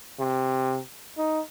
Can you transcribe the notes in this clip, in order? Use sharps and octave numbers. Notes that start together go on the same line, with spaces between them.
C3
D#4